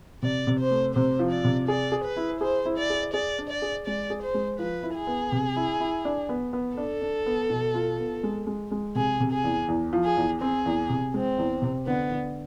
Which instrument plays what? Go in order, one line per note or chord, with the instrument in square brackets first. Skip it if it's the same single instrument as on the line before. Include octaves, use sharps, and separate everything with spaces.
[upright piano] C3 [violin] D5
[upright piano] C3
[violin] C5
[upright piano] A3
[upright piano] C3 [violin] C5
[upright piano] F3
[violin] D5
[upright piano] C3
[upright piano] G#4 [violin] D5
[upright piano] G#4
[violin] B4
[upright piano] E4
[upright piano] G#4 [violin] C5
[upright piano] E4
[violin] D5
[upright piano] G#4
[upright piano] G#4 [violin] D5
[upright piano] D4
[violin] D5
[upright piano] G#4
[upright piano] G#3 [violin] D5
[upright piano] G#4
[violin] C5
[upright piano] G#3
[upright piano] F3 [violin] B4
[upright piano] E4
[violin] G#4
[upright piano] B3
C3
E4
E4
D4
B3
B3
[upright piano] D4 [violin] A4
[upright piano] D4
B3
B2
F4
B3
G#3
G#3
G#3
[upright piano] C3 [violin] G#4
[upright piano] C3
[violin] G#4
[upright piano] E2
E2
F3
[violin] G#4
[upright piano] E2
[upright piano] C4 [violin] G#4
[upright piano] E2
C3
[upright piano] G#3 [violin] C4
[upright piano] E2
C3
[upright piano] D3 [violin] B3
[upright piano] D3